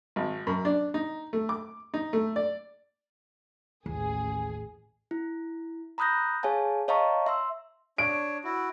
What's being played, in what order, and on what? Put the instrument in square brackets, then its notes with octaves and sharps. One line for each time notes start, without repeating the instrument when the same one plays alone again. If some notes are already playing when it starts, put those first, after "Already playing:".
[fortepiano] G#1
F#2
D4
D#4
A3
D6
D#4
A3
D5
[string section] A1 G#4 [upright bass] D#2
[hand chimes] E4
A#5 B5 D#6 F#6 G6 A#6
G#4 C#5 F5 G#5 A5
C#5 D#5 F5 A5 A#5 C#6
E5 C6 E6
[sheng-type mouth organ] D4 C#5 [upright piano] D7
[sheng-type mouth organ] E4 F#4